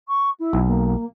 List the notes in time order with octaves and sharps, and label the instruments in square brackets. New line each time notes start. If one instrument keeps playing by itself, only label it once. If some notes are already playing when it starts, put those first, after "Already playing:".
[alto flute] C#6
E4
[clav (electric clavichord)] B1
[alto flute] A#3